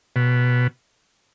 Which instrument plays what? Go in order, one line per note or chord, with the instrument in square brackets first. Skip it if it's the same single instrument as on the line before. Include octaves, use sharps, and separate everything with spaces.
[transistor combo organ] B2